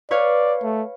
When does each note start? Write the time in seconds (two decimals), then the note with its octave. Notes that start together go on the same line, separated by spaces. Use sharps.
0.11 B4 C#5 D5 F5
0.63 A3